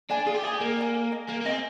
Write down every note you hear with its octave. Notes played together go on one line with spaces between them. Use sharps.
D4 D5 G#5
F4 G#4
G4
G#4 D5 G#5
G4
A#3 G#4
D5 G#5
A#4
D#5 G#5
A#3 A#4
A#3
C4 D#5 G#5